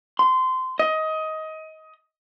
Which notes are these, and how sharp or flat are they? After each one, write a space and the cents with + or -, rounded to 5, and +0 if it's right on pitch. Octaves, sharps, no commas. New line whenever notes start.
C6 -20
D#5 +20